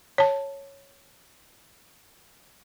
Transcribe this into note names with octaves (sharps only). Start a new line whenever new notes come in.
C#5 A5